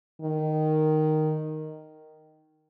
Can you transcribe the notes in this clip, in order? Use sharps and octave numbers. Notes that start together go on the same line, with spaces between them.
D#3